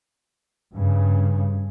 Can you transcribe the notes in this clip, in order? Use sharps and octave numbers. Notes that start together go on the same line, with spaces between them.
G2 C#3